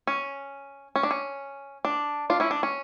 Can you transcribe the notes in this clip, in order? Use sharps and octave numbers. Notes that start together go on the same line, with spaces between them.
C#4
C#4
D4
C#4
D4
D4 F4
C#4 E4
D4
C#4